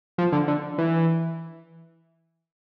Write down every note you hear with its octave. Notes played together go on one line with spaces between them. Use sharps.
F3
D3
D3
E3